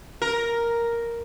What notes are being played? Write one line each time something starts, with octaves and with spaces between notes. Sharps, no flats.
A#4